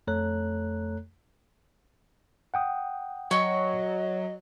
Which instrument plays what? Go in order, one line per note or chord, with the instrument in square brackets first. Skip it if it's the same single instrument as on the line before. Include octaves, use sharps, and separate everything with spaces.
[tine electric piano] F2 A3 A4 C#5 A#5 F#6
F#5 G5 D#6
[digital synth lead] F#3 [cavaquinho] C#5 C#6 [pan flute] D#5